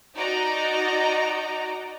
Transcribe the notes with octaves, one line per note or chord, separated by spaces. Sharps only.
D#4 F#4 D5 D#5 A#5